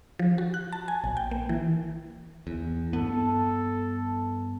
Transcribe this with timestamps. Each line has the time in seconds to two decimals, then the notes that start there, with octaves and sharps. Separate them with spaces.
0.19 F3
0.38 F#4
0.54 F#6
0.72 A5
0.88 G#5
1.04 A#1
1.17 G5
1.31 A#3
1.49 E3
2.47 E2
2.93 G2 B3 A4